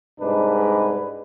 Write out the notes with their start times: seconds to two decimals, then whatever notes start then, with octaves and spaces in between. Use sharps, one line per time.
0.20 C2 G#2 G#3 D4 B4